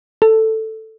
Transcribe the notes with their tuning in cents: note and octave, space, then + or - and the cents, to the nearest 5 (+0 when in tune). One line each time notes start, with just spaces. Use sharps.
A4 +5